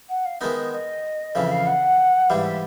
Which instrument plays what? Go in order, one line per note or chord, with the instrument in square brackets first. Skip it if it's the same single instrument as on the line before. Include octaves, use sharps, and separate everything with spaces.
[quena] F#5
F5
[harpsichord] D#3 G#3 B3 D#4 [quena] E5
[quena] D#5
D#5
[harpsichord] F2 C#3 E3 [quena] E5
[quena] F5
F#5
[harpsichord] G#2 E3 G3 [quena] F5
[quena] E5